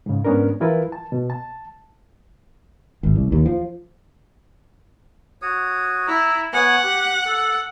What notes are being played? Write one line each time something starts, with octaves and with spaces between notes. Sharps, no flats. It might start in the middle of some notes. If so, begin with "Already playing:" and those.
G#2 C#3
G#2 B3 C#4 D4 A#4
E3 F3 E4 F4 A#4 B4
A5
B2
A5
G#1
C2
D#2
F3
F#4 C#5 D#6
E4 A#5 E6
B3 C#5 F#5 G#5
G4
A4